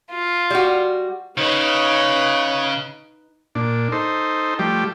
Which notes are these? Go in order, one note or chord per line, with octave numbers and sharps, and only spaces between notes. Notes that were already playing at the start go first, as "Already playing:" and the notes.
F4
G3 F#4
C#3 D#4 B4 C#5
A#2 D4
D#4 A4 C5
F3 G3 A3 G4